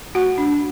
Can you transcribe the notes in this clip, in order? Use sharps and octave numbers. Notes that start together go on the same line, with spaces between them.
A3 F#4 F#5
D4